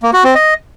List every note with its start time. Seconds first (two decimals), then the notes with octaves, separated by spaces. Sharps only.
0.03 A#3
0.13 F#4
0.24 C4
0.35 D#5